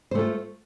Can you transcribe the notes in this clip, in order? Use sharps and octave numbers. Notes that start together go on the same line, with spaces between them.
A3 F4 C5